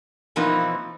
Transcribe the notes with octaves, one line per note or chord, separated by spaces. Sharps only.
B2 E3 F3 A#3 C4 D#4